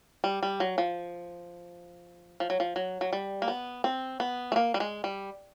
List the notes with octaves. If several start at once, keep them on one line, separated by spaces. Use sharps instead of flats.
G3
G3
F#3
F3
F3
F#3
F3
F#3
F#3
G3
A#3
B3
C4
B3
A3
A#3
G3
G#3
G3